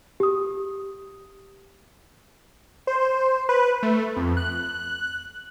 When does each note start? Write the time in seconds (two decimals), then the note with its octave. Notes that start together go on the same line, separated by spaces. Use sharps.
0.20 G4 D#6
2.87 C5
3.49 B4
3.83 A3
4.16 F2
4.37 F#6